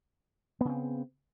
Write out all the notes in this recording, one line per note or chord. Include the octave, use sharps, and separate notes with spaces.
C#3 B3 C4